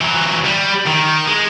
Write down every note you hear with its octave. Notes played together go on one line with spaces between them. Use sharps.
E3 F#3
G3
D#3
G#3